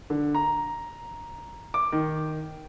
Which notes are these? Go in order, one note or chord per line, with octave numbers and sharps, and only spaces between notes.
D3
A#5
D6
D#3